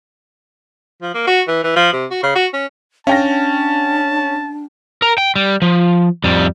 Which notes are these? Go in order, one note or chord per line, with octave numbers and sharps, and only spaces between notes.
F3
A#3
F#4
E3
E3
F3
C3
F#4
C#3
F#4
C#4
C#4 D4 F5 G5 A5 A#6
A#4
G5
G3
F3
F2 G3